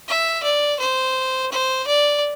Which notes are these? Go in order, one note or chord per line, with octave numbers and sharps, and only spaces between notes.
E5
D5
C5
C5
D5